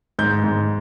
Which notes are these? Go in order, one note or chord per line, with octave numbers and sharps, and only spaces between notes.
G#2 G6
G#2